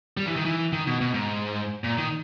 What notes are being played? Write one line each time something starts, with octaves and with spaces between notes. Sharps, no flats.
G3
E3
D#3
E3
D#3
B2
B2
G#2
A#2
D#3